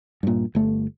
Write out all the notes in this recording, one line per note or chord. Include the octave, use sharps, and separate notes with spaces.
G2 A#2
G1 A3